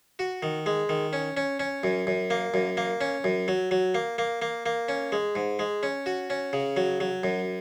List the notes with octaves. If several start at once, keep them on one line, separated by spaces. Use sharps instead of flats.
F#4
D#3
G#3
D#3
C#4
C#4
C#4
F#2
F#2
A#3
F#2
A#3
C#4
F#2
F#3
F#3
A#3
A#3
A#3
A#3
C#4
G#3
G#2
G#3
C#4
F#4
C#4
C#3
F#3
F#3
F#2